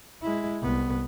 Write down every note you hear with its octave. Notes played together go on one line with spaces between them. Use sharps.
G#3 E4
C2 B3